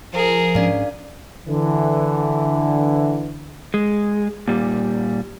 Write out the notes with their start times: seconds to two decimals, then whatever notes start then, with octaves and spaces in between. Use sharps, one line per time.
0.13 F3 G#4 A#4
0.55 G#2 C#4 D4 D5 F5
1.47 D3 E3
3.74 G#3
4.48 A#2 G3